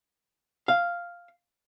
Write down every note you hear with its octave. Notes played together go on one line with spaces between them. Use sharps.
F5